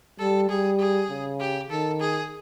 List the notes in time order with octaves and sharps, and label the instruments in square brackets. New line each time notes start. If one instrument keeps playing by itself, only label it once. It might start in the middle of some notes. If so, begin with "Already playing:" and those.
[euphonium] G3 [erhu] A4
[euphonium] G3 [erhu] G#4
[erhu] G#4
[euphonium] C#3
[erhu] G4
[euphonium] D#3 [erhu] A4
[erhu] G#4